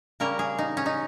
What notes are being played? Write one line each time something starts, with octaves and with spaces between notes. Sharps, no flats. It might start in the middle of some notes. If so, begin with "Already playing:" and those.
C#3 G3 A#3 C#4 A#4
G#4
D#4
C#4
D#4